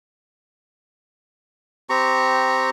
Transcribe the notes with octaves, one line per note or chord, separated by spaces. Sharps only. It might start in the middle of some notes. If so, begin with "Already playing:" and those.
C4 G4 A#5 C#6